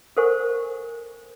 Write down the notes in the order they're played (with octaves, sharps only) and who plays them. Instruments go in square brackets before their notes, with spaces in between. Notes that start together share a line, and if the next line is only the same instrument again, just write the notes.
[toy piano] A4 A#4 C5 F#5 G#5 C#6